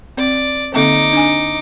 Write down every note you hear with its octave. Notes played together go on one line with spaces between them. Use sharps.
C4 D5
D3 A#3 C4 D#4 D6
D4 G#5